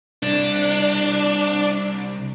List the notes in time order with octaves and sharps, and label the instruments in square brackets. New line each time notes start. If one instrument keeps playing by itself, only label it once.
[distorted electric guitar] C2 [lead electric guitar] D4